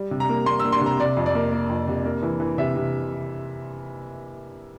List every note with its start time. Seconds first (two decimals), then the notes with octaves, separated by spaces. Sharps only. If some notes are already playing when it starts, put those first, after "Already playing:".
Already playing: G3
0.11 C3
0.20 A#5
0.29 A#3
0.46 A#3 C6
0.60 E6
0.64 A#3
0.72 C6
0.81 C3
0.86 A#5
1.00 C3 D5
1.17 F2
1.26 D5
1.35 A#3
1.52 A#3
1.69 F2
1.88 C3
2.05 A#3
2.22 E3
2.40 E3
2.58 C3 E5
2.76 C3